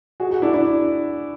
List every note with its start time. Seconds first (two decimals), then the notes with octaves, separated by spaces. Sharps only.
0.20 F#4 G#4
0.31 F#4 G#4
0.42 D4 E4
0.54 D4 E4